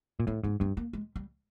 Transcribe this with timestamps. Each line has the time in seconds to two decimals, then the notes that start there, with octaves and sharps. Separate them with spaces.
0.20 A#2
0.27 A2 B3
0.44 G#2 B3
0.60 G2 B3
0.77 A#3
0.93 G#3
1.16 G3